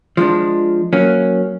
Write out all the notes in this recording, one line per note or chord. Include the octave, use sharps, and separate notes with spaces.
F3 G#3 D4
F#3 A#3 C#4